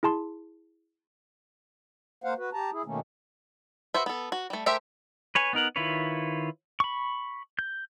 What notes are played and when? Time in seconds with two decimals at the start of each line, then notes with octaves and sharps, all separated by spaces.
0.03 E4 G#4 A5 C6
2.24 A#3 C5 F5 F#5
2.38 F#4 B4
2.53 G4 A5 A#5
2.72 E4 G#4
2.86 B2 D#3 A3 A#3 C#4
3.94 F#4 B4 C5 E5
4.06 B3 A4
4.32 F#4
4.50 G3 A3
4.66 A3 G4 A#4 C5 E5
5.35 B4 C#5 G#5
5.53 B3 D#4 A#4 F#5
5.76 D#3 E4 F4 B4 C#5
6.80 B5 C#6
7.59 G6